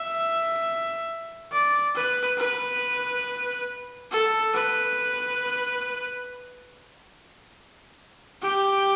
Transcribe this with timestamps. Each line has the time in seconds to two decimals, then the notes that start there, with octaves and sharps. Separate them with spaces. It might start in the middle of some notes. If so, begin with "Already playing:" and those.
Already playing: E5
1.52 D5
1.95 B4
2.38 B4
4.11 A4
4.54 B4
8.42 G4